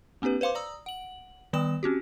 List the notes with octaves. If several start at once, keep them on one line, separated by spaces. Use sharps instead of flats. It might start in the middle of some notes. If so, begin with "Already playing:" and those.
A#3 C4 D4 G4 B4
B4 C5 F5 C6 D6
D5 A#5 D#6 E6
F#5 F#7
D#3 G3 B3 D5 D#6 E7
C4 C#4 F#4 G4